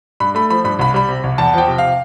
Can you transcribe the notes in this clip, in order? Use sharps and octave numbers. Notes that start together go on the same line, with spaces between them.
G2 B5
A3 B5
F3 B5
G2 B5
C2 B5
G3 B5
C3
C2
E2 A5
F3 G5
C3
F5